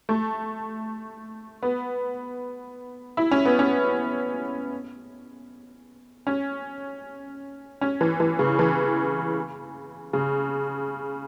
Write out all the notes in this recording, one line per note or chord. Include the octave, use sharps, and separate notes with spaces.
A3
B3
E4
C#4
B3
C#4
C#4
C#4
E3
E3
C#3
E3
C#3